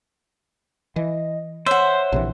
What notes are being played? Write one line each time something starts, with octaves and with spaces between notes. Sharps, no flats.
E3 D#5
C5 C#5 E5 F#5
A#1 C3 E3